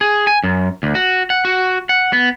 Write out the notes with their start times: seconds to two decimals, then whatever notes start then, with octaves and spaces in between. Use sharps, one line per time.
0.01 G#4
0.27 G#5
0.44 F#2
0.83 D2
0.95 F#4
1.30 F#5
1.45 F#4
1.89 F#5
2.13 B3